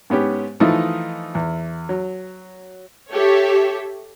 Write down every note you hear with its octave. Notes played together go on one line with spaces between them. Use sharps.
G#2 B3 C#4 G4
E3 F3 A3 D#4 F4
E2
F#3
G4 A4 C#5 E5